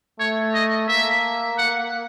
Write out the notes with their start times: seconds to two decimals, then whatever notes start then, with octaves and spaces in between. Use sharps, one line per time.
0.20 A3 C#5
0.54 D#5
0.88 A#3 E5
1.58 F#5